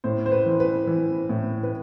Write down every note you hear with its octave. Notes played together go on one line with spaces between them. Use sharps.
A2 C5
C5
B4
E3
B4
E3
A2
B4